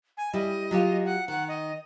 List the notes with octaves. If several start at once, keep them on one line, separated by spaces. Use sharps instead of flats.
G#5
G3 E4 D#5
F#3 F4 G4
F#5
D#3 F#5
D#5